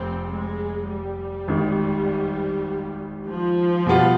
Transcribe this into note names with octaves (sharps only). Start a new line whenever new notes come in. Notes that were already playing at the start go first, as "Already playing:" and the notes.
Already playing: F1 C4
G#3
G3
G#1 G#2 D#3
F3
B2 G3 B3 F4